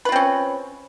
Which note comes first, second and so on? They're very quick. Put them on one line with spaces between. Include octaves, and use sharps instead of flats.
B4 F4 C4 C#4